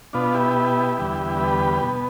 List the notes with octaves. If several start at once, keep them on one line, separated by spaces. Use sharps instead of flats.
B2 B3 D4 F4
E4 G4
E2 D3 G3 B3
G4 B4
B2 B3